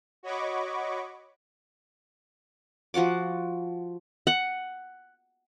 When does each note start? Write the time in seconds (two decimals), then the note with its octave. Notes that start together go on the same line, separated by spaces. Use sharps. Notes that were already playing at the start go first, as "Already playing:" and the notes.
0.23 F#4 C#5 D#5 B5 C#6 D6
2.94 F3 F#4 F#5 D6
4.27 F#5